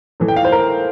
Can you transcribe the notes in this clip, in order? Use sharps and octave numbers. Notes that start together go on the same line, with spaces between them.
A2 E3
G5
F5
C5
A#4